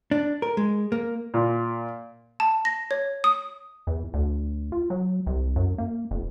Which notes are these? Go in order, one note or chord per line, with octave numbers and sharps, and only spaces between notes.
D4
A#4
G#3
A#3
A#2
A5
A#6
C#5
D#6
E2
D2
F4
F#3
C2
F#2
A#3
F1